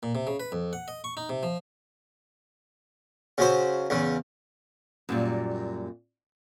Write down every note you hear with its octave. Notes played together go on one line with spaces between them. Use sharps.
A#2
C3
C#3
B4
F2
F#5
D#5
C#6
D#4
C3
F3
C#3 F#3 C5
E2 C#3
F#2 A#2 G3